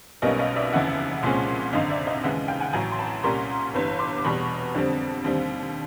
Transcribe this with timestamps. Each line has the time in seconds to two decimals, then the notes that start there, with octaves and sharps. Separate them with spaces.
0.22 B1 B2 G3 A#3 C#4 D#5 F5
0.39 D#5 F5
0.56 D5 E5
0.72 F1 D#2 C#3 E3 E5 F#5
1.23 C2 A#2 F3 G#3 C#4
1.73 G#1 F#2 D3 D#5 F5
1.90 D5 E5
2.07 D#5 F5
2.24 D#2 C#3 E3 G#3 E5 F#5
2.48 F5 G5
2.61 F#5 G#5
2.73 A1 A2 F#3 G#5 A#5
2.92 C6
2.98 A5 B5
3.23 C2 A#2 G3 A#3 C#4 A#5 C6
3.74 G1 G2 E3
3.99 C6 D6
4.18 D6
4.24 E2 B2 G3 B5 C#6
4.75 F2 D3 G3 C4
5.24 D#2 D3 G3 C4